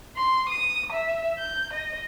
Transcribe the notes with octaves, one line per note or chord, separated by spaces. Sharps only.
C6
D#6
E5
G6
D#5